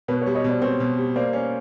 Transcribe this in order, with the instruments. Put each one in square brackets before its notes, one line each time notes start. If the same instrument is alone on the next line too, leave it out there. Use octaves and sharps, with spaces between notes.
[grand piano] B2 [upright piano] B4 C#5
[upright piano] B4 C#5
[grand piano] G3
[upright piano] C#5 D#5
[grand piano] B2 [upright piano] C5 D5
[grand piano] C4 [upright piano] B4 C#5
[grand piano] B2
G3
[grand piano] A#3 [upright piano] C5 D5
[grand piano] C#4